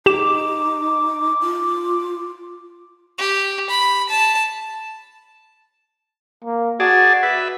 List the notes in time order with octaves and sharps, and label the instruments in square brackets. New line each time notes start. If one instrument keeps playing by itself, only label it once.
[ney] D#4 [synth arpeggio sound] G4 E7 [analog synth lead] D6
[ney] F4
[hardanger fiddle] G4
B5
A5
[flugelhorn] A#3
[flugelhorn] F#4 [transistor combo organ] G#4 D5 A5
[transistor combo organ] B4 E5